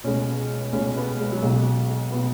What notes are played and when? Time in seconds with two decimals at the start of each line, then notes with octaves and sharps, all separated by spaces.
0.04 C#2 B2 C#4
0.73 C#2 B2 C#4
0.96 B3
1.20 G#3
1.32 F#3
1.42 B1 B2 G#3
2.11 B2 B3